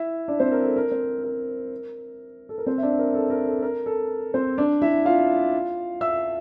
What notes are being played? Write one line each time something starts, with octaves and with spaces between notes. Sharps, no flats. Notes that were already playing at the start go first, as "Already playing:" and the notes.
Already playing: E4 E5
D4 D5
C4 C5
A#4
A4
A#4
C4 C5
A#4
A4
A#4
C4 C5
E5
D4 D5
A#4
A4
A#4
A4
A#4
A4
C4 C5
D4 D5
E4 E5
F4 F5
E5 E6